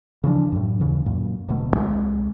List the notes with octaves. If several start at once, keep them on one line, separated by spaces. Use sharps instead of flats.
C#3 E3 F3 D4
F#2 A2
D#2 C#3 E3
F#2 A#2
D1 D2 B2 A3
C2 G#3